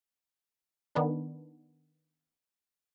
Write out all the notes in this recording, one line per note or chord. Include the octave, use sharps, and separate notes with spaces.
D#3 B3 D4